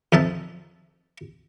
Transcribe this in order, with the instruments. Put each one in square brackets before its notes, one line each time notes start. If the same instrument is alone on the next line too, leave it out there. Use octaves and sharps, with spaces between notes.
[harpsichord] F2 D#4 A4 E5